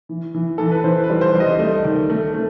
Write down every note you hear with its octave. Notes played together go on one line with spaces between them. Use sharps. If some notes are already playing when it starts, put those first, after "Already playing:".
E3
E3
E3 A4
B4
E3 C5
B4
G3
C5
G3
D#5
A3
D#3
A3
A3